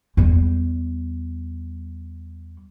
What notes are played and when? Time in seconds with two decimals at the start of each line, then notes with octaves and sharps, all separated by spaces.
0.17 E2 G3